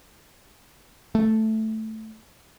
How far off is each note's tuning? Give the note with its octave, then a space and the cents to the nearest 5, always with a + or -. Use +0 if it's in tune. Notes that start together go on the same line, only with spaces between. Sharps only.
A3 +0